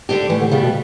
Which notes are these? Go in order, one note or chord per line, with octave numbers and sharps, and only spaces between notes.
D3 G3 D4 G4
A2 E3
D3
C#3 G3 B3
B2